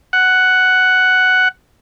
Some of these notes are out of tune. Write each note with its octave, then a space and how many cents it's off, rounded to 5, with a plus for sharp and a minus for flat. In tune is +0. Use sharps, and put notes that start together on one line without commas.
F#5 +5